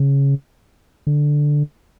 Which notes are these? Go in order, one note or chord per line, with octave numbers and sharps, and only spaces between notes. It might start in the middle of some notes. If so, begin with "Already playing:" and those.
Already playing: C#3
D3